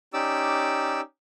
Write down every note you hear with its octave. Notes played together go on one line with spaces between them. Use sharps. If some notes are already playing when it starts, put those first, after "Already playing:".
C#4 D#4 G4 D5 D6 E6